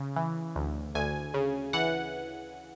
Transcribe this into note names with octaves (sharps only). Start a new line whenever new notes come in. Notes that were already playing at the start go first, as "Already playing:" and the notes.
Already playing: C#3
E3
D2
D2 G#5
C#3
E3 F#5